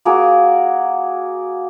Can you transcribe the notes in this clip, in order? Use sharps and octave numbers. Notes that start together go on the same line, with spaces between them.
A#3 F#4 G#4 A#4